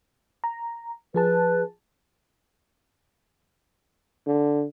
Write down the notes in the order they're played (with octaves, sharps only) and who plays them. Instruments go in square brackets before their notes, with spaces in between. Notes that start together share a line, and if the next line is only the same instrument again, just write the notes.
[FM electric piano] A#5
[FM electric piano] F3 G#4 A5 [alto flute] B4
[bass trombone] D3